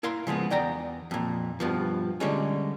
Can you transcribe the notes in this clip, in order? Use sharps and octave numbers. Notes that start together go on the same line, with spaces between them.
E4 A#4 F5 C6
C#3 F3 G#3 B3
E2 D5 G5 A#5
F2 A#2
G2 B2 F3
D3 G3 G#3 C#4